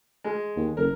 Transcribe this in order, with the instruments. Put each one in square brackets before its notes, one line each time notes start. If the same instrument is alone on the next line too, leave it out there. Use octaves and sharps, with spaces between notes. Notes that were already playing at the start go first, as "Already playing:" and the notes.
[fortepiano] G#3
[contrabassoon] D#2
[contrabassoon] F#1 [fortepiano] A#4